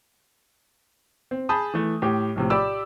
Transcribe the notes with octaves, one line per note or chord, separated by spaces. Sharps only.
C4
G#4 A5 B5 D#6 G6
E3 A3
A2 G4
A#1 A2 C3
G4 D5 B5 D6 E6